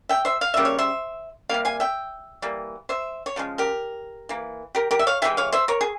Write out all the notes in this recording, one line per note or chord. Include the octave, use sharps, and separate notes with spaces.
E5 G5
C5 E5
F5
C#3 G3 A#3 E5
C#5
C5 E5
C3 G3 A#3 F5
F5 G#5
E5 G5
E3 G3 A#3
C5 E5
C#5
C#3 F3 G#3
G4 A#4
E3 A#3
G4 A#4
G4 A#4
E5
C#5 F5
C3 E3 G#3 E5 G5
C#5 F5
C5 E5
A#4 C#5
G#4